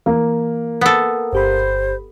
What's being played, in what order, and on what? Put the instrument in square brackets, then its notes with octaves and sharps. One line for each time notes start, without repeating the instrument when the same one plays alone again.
[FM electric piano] E3 [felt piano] A#3
[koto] B3 A4
[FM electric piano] G1 G4 B5 [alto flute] C5